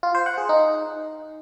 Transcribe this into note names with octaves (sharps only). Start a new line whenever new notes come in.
F4
C5
F#5
G#4
D#4